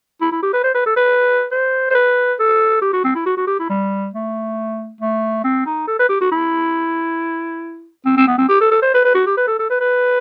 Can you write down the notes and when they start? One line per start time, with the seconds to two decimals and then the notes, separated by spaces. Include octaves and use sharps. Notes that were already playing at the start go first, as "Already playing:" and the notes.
0.21 E4
0.32 E4
0.43 G4
0.53 B4
0.64 C5
0.75 B4
0.86 A4
0.97 B4
1.52 C5
1.91 C5
1.95 B4
2.39 A4
2.82 G4
2.93 F#4
3.04 C4
3.15 E4
3.26 F#4
3.37 F#4
3.48 G4
3.59 E4
3.70 G3
4.14 A3
5.01 A3
5.44 C4
5.66 D#4
5.88 A4
5.99 B4
6.09 G4
6.21 F#4
6.32 E4
8.06 C4
8.17 C4
8.28 B3
8.38 C4
8.49 G4
8.61 A4
8.72 A4
8.82 C5
8.94 B4
9.05 B4
9.15 F#4
9.27 G4
9.37 B4
9.48 A4
9.59 A4
9.70 B4
9.81 B4